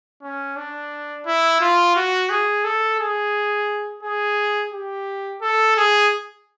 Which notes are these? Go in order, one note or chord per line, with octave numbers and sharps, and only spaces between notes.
C#4
D4
E4
F4
F#4
G#4
A4
G#4
G#4
G4
A4
G#4